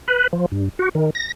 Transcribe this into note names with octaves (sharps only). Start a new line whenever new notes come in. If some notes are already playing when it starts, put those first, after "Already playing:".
B4
F3
G2
F#4
D#3
A#6